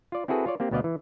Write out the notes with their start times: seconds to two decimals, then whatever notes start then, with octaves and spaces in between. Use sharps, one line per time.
0.12 F4 D5
0.28 C4 E4 F#4 G#4 A4 B4
0.46 F4 C#5 D5
0.60 A#3 C4 G4
0.71 D2 B2 B3 D5 D#5 F5
0.84 E3